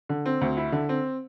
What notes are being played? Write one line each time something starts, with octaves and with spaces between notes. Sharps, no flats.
D3
C4
D2
E4
D3
C4